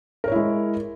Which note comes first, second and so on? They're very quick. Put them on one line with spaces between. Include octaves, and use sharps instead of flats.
A#4 C#5 E4 G#3